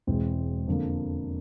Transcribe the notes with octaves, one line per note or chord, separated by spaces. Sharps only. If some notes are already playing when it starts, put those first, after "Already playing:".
E1 E2 B2 G#3 C4
F2 D3 F3 A#3